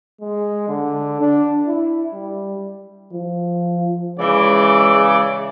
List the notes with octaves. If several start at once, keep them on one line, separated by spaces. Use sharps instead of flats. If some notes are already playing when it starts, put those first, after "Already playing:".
G#3
D3
D4
E4
G3
F3
C#3 E3 G#3 D5